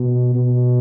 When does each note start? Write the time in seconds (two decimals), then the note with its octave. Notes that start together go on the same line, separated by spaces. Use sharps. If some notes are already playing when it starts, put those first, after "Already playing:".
Already playing: B2
0.35 B2